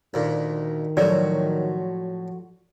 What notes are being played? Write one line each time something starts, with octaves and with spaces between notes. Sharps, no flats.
D2 A#2 D#3
A2 F3 F#3 F#4 A#4 D5